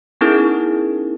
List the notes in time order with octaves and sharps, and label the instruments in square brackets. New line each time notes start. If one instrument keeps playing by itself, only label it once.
[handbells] B3 C#4 D#4 E4 G#4 A#4